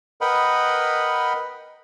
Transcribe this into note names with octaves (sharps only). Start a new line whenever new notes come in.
A#4 B4 D#5 F#5 G5 B5